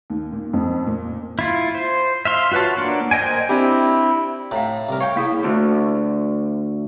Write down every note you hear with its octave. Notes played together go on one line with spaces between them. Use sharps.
D#2
A#2
F2
A#2
E4 F4
C5
E5 F5 C6
F4 F#4 B4 C#5 A5
A#3 D4 F#5
A#4 C5 D#5 G5 G#5
C4 D4 E4 G4
A2 F5 A#5
C2 A#4
C#5 F5 G5
A#3 E4 G#4
D2